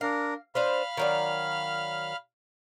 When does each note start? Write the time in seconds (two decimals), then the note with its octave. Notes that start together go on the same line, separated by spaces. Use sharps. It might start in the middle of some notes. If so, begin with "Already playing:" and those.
0.01 D4 A#4 F5
0.55 D4 B4 C5 F5 B5 F6
0.97 D#3 F#3 D5